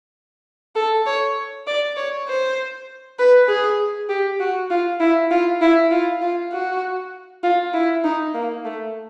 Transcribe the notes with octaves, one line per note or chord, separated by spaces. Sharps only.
A4
C#5
D5
C#5
C5
B4
G#4
G4
F#4
F4
E4
F4
E4
F4
F4
F#4
F4
E4
D#4
A#3
A3